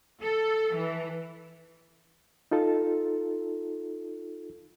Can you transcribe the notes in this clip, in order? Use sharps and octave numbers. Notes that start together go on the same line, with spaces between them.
A4
E3
D#4 F4 A4